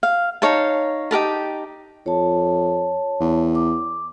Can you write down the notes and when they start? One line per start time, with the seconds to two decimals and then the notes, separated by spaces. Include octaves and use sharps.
0.03 F5
0.42 D#4 C#5 F5 A5
1.11 D#4 G4 A#4 A5
2.06 F2 C#5 A5
3.20 E2
3.55 D6